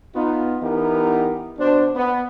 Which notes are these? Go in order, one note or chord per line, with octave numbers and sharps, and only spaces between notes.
B3 D#4 F4
E3 B3 D#4 E4 G4 A#4
B2 D4 C5
B3